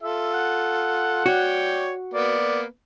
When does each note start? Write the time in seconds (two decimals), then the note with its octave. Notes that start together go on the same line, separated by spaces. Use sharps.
0.02 F4 A4 E5
0.34 F#5
1.26 F#4 C#5 D5 G5
2.14 A#3 B3 B4 D5